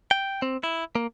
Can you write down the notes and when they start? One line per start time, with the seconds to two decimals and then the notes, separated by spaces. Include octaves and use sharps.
0.11 G5
0.42 C4
0.63 E4
0.95 A#3